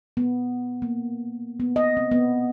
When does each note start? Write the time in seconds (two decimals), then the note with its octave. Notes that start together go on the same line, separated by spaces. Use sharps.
0.17 B3
0.82 A#3
1.60 B3
1.76 D#5
1.97 C4
2.11 B3